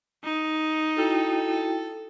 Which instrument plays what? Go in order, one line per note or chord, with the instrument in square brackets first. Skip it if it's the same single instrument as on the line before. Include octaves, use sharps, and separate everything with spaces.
[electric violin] D#4
[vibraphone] E4 F#4 G5 [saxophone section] A4